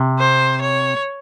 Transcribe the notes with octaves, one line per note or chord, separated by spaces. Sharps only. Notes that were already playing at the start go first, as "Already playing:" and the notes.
Already playing: C3
C5
C#5